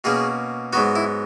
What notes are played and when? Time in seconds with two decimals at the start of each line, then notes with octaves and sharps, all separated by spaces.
0.04 B2 A#3 C#4 G#4
0.73 G#2 F#3 B3 F#4
0.96 E4